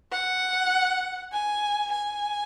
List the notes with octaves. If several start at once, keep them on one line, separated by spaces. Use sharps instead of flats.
F#5
G#5
G#5